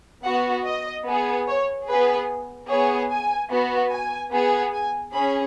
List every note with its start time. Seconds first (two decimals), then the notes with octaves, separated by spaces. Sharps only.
0.24 B3 F#4 F#5
0.65 D#5
1.06 B3 G#4
1.47 C#5
1.87 B3 G#4 B4
2.69 B3 G#4 C#5
3.10 G#5
3.51 B3 F#4
3.91 G#5
4.32 B3 G#4
4.73 G#5
5.13 C#4 G#4 B5